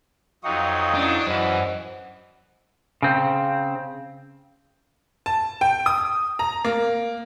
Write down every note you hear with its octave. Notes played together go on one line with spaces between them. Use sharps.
F2 F#3 D#4 F5 G5 C#6 D#6
C#4 D4 E4 D5
F#2 E3 C5 D#5 F#5
C#3 C4
A5
G5
D#6
A#5
A#3